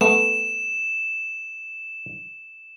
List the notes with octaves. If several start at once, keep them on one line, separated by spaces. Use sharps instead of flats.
A3 B3 E7